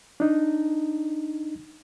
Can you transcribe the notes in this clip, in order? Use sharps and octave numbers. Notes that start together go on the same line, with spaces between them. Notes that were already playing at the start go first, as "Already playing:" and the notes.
D4 D#4